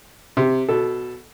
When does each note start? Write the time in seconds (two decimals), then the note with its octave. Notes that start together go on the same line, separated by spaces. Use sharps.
0.37 C3
0.69 B2 A4